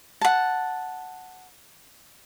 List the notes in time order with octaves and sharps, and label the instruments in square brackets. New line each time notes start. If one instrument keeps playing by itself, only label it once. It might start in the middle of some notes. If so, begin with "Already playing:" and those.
[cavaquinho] F#5 A5